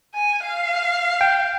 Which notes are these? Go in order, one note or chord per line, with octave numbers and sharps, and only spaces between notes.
G#5
F5
G5